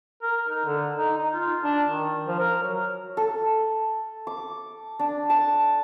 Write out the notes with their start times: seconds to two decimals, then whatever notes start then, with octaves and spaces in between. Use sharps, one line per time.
0.22 A#4
0.49 D#4
0.65 D3
0.95 D#4
1.18 D#4
1.33 F4
1.63 D4
1.88 D#3
2.27 F3
2.40 A#4
2.62 F#3
3.17 A4
4.27 D6
4.99 D4
5.30 A5